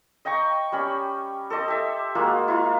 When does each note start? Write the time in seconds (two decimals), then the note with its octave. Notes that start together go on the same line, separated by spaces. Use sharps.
0.25 D#5 G5 A#5 C#6
0.72 G3 C#4 B5
1.50 A4 C5 D#5 D6
1.68 G4 E5
2.15 G#3 A#3 F4 F#4
2.48 E4 F4